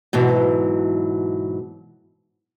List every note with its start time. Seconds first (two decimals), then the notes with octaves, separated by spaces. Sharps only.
0.13 G#2 B2 E3 F#3